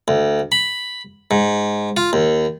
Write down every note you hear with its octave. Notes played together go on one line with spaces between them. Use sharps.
D2
B5
G#2
F4
D#2